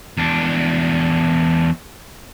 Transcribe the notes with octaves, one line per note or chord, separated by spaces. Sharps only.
E2 D4